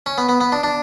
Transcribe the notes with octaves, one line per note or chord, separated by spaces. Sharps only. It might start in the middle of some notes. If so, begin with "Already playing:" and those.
C#4
B3
B3
B3
D4
D4